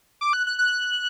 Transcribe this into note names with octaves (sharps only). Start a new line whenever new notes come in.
D6
F#6
F#6
F#6